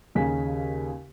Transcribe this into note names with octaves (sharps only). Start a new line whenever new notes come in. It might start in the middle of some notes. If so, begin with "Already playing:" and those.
D#2 C#3 G#5 B6